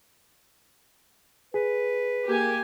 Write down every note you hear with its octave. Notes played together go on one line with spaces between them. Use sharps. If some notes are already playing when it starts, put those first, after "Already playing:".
G#4 B4
A#3 G4 G#5